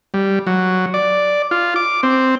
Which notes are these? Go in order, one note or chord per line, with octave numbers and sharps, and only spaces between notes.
G3
F#3
D5
F4
D6
C4